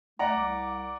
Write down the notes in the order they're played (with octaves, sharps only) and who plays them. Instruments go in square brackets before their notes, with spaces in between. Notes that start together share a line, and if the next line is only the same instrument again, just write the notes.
[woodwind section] A3 [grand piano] D5 F#5 A#5
[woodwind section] C2 D6